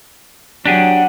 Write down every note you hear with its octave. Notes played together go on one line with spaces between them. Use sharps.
F#3 D4 G4 G#4 F#5